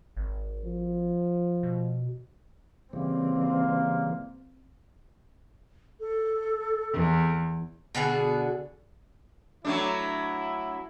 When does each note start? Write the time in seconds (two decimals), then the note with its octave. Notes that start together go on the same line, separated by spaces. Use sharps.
0.17 G#1
0.65 F3
1.63 B2
2.93 C#3 E3 G3 A#3 C4
6.00 A4
6.93 E2
7.95 B2 D3 F#4 G#4
9.65 F#3 A3 D4 E4